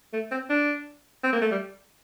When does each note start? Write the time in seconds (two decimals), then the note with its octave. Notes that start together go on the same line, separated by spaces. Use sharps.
0.13 A3
0.31 C4
0.50 D4
1.23 C4
1.33 A#3
1.41 A3
1.51 G3